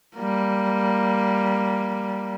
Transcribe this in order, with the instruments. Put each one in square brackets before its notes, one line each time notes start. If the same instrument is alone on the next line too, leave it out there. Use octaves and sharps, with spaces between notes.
[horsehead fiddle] G3 A#3